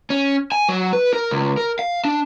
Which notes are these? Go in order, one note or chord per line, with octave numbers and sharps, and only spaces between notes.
C#4
G#5
F#3
B4
A#4
C#2
A#4
F5
D4